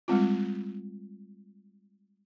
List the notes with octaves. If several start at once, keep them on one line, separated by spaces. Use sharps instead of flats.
G3 G#3 C4 F4